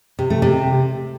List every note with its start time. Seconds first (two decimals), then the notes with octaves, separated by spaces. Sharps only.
0.19 C3
0.30 A3
0.42 C3